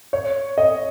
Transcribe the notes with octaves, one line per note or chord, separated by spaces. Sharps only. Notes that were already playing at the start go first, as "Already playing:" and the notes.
C#5
D#5